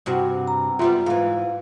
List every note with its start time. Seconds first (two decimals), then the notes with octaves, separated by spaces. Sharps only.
0.06 G2 C3 F#4
0.47 A#5
0.79 F#2 G3 B3 F4 E5 C6
1.06 G#2 E3 F5